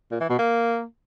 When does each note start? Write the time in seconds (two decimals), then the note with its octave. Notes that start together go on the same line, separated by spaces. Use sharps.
0.12 A#2
0.21 E3
0.30 B2
0.39 A#3